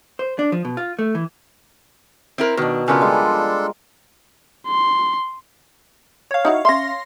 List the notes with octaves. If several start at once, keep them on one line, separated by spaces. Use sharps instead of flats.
C5
D4
F3
B2
F4
A3
E3
C4 E4 A#4
B2 D#3 D4
C#3 F3 B3 D4 F4 A4 A#4 G#5
G3 G#3 F4
C6
C#5 F5
D#4 E4 F#4
C#4 E5 C6 A#6